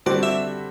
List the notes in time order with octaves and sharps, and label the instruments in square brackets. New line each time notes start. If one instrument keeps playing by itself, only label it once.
[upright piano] D3 G3 C4 F#4 C5 [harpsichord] D5
[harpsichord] E5